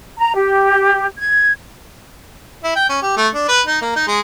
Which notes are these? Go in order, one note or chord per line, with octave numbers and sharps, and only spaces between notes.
A#5
G4
G#6
E4
G5
C#4
G4
A3
D4
B4
D#4
A#3
D#4
G#3